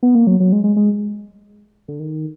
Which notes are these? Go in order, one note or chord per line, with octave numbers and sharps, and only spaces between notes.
B3
A#3
F#3
F#3
G#3
G#3
G#3
D3
D#3